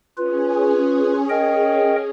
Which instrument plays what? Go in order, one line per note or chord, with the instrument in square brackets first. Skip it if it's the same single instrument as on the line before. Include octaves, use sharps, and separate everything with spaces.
[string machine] C#4 G#4 [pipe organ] F4 B4
[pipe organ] A#4 D#5 G5